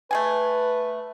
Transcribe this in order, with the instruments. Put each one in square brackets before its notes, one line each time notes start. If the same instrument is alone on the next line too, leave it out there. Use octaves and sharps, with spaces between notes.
[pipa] A3 G#4 G#5 [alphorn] B4